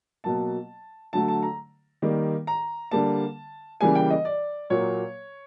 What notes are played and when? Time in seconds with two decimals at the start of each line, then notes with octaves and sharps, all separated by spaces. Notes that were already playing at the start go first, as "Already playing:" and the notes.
0.24 B2 F#3 A#3 A5
1.13 D3 F#3 A3 A5
1.28 A5
1.43 A#5
2.02 D#3 G3 A#3
2.47 A#5
2.91 D3 G3 A#3 A5
3.81 C#3 E3 G3 A#3 G#5
3.95 G5
4.10 D#5
4.25 D5
4.70 A#2 F#3 A#3 C#5